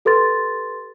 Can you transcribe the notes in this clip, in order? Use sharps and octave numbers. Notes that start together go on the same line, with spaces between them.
G4 A4 B4 C6 A6